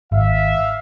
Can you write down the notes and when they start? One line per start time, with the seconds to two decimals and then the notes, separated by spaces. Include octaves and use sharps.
0.12 G#1 E5 F5